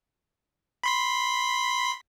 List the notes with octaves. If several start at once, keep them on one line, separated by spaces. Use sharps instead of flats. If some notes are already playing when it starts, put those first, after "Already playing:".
B5 C6 B6